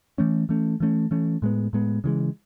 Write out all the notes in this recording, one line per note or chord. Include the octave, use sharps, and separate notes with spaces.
E3 A3 C#4
E3 A3 C#4
E3 A3 C#4
E3 A3 C#4
A2 G#3 B3
A2 G#3 B3
C#3 E3 G#3